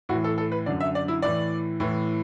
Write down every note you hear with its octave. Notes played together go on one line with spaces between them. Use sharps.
A2 E3 F#4
A4
A4
B4
F#2 D3 D5
E5
D5
E4
A2 E3 D5
A2 E3